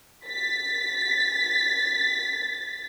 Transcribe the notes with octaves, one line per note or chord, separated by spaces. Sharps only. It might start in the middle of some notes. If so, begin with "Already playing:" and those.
A6 B6